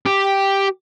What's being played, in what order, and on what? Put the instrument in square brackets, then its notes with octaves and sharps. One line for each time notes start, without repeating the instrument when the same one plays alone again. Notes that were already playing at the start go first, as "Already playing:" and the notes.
[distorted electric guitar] G4